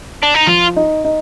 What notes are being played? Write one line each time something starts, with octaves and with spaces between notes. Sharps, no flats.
D4
D#4
F3 F4
D#4
D#4